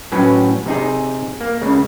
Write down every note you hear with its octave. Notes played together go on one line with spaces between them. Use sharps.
A2 F#3 C#4 B4
C3 D#4 G#4
A#3
C#2 C#3